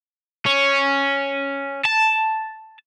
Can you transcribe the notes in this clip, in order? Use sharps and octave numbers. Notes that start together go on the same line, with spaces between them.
C#4
A5